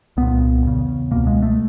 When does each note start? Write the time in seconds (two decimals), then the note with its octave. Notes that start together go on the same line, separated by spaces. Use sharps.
0.17 C2 A#2 B3
0.64 E2 C#3
1.11 C#2 B2 A#3
1.27 G#3
1.42 A3